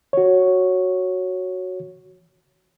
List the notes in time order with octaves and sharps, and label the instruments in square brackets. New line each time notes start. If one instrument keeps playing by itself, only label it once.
[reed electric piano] F#4 C#5